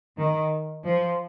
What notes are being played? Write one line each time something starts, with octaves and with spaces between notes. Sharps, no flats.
D#3
F3